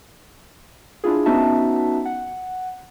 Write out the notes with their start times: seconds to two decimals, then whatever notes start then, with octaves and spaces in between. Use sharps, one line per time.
1.04 D4 E4 F4 G#4
1.26 B3 C#4 D#4 F#4 E5 A5
2.05 F#5